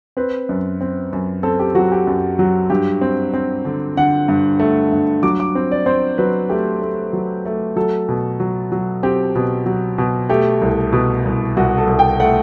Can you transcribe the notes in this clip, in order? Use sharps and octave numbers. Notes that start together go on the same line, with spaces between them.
C4 B4
F#2
C4
F#2
C4 A4
G4
F#3 F#4
G4
F#2
F#3
G2 G4
C4
C4
D3
D3 F#5
G2
A3
G2
F#3 D6
D6
C4
D5
C4 C5
F#3 B4
A3 G4
A3
F#3
A3
F#3 A4
B2
F#3
F#3
C4 G4
B2
F#3
B2
A3 G4
C2
B2
C2
C2 F#4
A4
C2
G5
A3 F#5